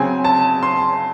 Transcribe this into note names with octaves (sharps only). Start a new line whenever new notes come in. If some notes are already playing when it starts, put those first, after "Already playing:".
Already playing: C#3 F#3 C4 G#5
A5
C6